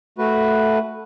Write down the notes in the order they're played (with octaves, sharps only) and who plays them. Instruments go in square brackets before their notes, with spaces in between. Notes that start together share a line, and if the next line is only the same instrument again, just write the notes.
[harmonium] A3 F#4 B4